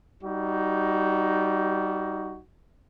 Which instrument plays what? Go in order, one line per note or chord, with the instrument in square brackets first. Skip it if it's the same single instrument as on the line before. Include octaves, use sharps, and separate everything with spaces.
[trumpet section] G3 D#4 F#4